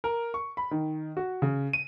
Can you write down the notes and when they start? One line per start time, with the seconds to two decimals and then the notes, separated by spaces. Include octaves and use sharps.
0.04 A#4
0.34 C#6
0.57 B5
0.71 D#3
1.17 F#4
1.42 C#3
1.73 D#7